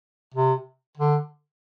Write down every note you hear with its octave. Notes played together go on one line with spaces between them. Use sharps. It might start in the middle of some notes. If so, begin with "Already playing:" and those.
C3
D3